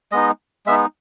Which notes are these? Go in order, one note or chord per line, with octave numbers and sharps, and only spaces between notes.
G#3 B3 D#4 D#5
G#3 B3 D#4 E5